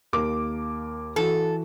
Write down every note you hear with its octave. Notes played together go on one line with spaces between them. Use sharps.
D#2 A#3 D6
E3 F#4 A4